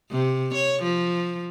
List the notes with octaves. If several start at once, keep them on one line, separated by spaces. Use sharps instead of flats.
C3
C#5
F3